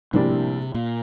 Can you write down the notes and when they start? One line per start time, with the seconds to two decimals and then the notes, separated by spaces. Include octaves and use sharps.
0.13 A#1 A2 C3 G3 A#3 D4
0.75 A#2